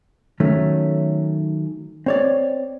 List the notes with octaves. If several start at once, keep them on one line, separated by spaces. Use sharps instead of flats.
D#3 F#3 A3 C#4
C4 C#5 D5